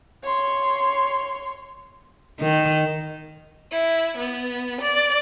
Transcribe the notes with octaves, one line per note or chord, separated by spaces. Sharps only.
C#5 C6
D#3
E4
B3
D5